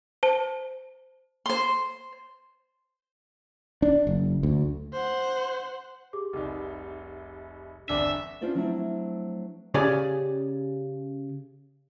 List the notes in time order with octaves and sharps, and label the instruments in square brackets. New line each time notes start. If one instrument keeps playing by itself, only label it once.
[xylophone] C5 A5
[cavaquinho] C5 C6
[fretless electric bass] D4
F#1
D2
[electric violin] C5 F#5
[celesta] G4 G#4 D6
[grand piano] F1 C2 D#4
[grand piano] G1 E2 C4 [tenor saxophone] D4 [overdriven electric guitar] E5
[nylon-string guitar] C#4 D4 F4 C5 D5 G#5
F3 F#3 A3 C4 D4 E4
[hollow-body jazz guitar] C#3 C#4 G4 G#4 D5 G#5